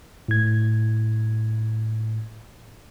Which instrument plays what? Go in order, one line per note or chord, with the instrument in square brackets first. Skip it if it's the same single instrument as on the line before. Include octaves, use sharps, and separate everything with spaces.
[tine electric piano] A2 G#6